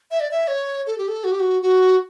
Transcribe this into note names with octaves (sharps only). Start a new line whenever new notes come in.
E5
D5
E5
C#5
A4
G4
A4
F#4
G4
F#4
F#4